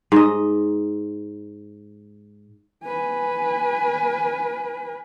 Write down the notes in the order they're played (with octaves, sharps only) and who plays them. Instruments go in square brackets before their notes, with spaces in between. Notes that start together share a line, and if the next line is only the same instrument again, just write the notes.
[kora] G#2 D#5
[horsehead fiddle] B4 G#5